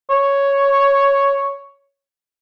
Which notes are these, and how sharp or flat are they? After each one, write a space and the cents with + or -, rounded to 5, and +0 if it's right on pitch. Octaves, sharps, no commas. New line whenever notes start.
C#5 +5